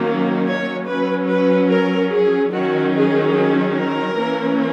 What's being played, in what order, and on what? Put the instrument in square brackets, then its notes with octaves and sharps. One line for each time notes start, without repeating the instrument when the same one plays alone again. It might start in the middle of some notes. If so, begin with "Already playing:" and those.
Already playing: [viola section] D#3 F#3 A#3 C#4
C#5
F#3 C#4 B4
B4
A#4
G#4
D#3 F#3 C#4 F#4
G#4
G#4
A#4
E3 A#3 C#4